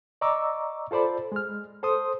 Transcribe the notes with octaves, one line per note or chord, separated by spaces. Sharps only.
D5 D#5 A#5 C#6 D6 E6
F4 A4 C5 D5 B5
G#3 F6
A4 C5 C6 D#6